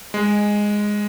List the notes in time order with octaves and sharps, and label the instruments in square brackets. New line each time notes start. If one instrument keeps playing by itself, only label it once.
[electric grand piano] G#3